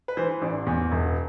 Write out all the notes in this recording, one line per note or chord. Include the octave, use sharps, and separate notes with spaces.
B4
E3 C5
A1 D5
E2
E1